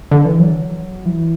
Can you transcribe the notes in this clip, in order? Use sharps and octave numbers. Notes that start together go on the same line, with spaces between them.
D3
E3
F#3
E3